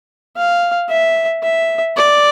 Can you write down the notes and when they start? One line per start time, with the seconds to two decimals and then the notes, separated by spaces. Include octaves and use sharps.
0.37 F5
0.90 E5
1.43 E5
1.97 D5